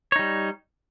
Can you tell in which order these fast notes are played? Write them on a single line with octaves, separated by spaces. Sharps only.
C#5 D#4 G3